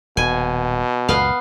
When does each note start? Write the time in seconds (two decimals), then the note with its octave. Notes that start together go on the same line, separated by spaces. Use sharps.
0.17 D#1 B2 G#5
1.09 C#2 F#2 A#2 B3 F5